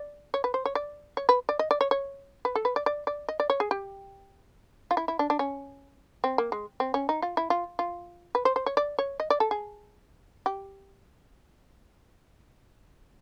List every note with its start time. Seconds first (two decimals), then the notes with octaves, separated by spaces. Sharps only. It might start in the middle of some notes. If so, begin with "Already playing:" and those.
Already playing: D5
0.34 C#5
0.44 B4
0.54 C5
0.65 C#5
0.75 D5
1.17 C#5
1.29 B4
1.49 D5
1.59 D#5
1.71 D5
1.81 C#5
1.91 C#5
2.45 B4
2.55 A4
2.65 B4
2.76 D5
2.86 D5
3.07 D5
3.29 D#5
3.40 D5
3.50 C#5
3.60 G#4
3.71 G4
4.91 F4
4.97 E4
5.08 E4
5.19 D4
5.30 D4
5.39 C#4
6.24 C4
6.38 A#3
6.52 G#3
6.80 C4
6.94 C#4
7.09 D#4
7.22 F4
7.37 E4
7.50 F4
7.79 F4
8.35 B4
8.45 C5
8.56 C5
8.66 C#5
8.77 D5
8.99 C#5
9.20 D#5
9.30 D5
9.40 A4
9.51 G#4
10.46 G4